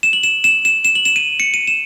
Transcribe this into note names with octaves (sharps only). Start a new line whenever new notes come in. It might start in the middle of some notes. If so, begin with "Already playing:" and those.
E7
F#7
E7
E7
E7
E7
F#7
E7
D#7
C#7
D#7
E7